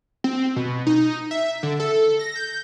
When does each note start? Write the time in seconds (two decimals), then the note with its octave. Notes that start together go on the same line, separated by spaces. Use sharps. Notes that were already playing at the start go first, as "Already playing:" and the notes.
0.24 C4
0.56 B2
0.87 D#4
1.31 E5
1.63 D3
1.80 A4
2.19 A#6
2.36 G6